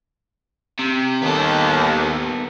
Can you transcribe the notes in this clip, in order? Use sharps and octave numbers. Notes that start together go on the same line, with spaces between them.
C3
D#2 B3 A4